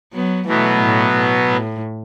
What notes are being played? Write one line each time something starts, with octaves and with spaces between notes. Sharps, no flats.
F#3 B3
B2 E3 F#3 A3 B3
A2
A2
A2